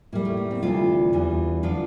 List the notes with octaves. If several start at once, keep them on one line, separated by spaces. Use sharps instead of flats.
A2 G3 A#3
A3
A#3
A3 C4
D2 C3 E3 G3 D4 F4
E2 E3 G3
D3 F3 D4 F4